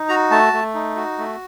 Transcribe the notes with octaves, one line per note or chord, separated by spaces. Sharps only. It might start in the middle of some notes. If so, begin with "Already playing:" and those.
Already playing: D#4
F#4 A#5
A3 A5
A3
D#4
F#4
A3